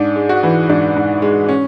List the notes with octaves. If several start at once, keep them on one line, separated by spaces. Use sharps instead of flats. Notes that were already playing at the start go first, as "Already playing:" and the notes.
Already playing: G#2 D4
G#3
F#4
E3
G#2 D4
G#2
G#3
C#4